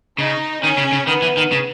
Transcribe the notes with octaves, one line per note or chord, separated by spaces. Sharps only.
C#3 D#4
D#3 C#4
C#3
C#3
D#3 B3
E3
D#3
C#3